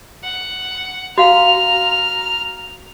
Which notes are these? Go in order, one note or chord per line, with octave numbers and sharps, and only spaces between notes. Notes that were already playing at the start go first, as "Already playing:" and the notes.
F#5
F#4 F5 A#5 F6